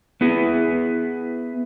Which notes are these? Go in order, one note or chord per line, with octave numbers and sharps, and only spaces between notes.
B3 E4 G#4